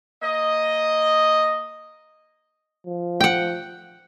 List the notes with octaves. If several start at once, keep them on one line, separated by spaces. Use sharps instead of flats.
A#3 D#5
F3
F#5 G5